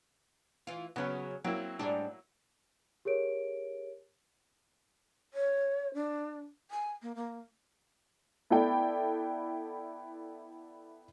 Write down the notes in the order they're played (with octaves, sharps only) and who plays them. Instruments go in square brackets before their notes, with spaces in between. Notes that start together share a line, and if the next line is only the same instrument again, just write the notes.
[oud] E3 F4
[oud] C#3 F#3 [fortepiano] B3 C#4 B4
[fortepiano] F#3 A#3 E4 [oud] C4
[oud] G#2 G3 D4
[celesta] G4 G#4 A#4 C#5 D7
[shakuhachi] C#5
D4
G#5
A#3
A#3
[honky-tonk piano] B3 E4 A4 D5 G5